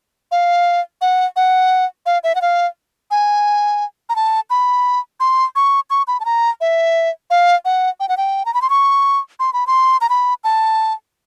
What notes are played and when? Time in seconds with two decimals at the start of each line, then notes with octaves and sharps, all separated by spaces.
0.31 F5
1.01 F#5
1.36 F#5
2.06 F5
2.24 E5
2.35 F#5
2.42 F5
3.11 G#5
4.09 A#5
4.16 A5
4.50 B5
5.20 C6
5.56 C#6
5.90 C#6
6.08 B5
6.20 A5
6.25 A#5
6.61 E5
7.30 F5
7.65 F#5
8.00 G5
8.09 F#5
8.17 G5
8.45 A#5
8.54 B5
8.62 C6
8.70 C#6
9.40 C6
9.53 B5
9.67 C6
10.01 A#5
10.09 B5
10.44 A5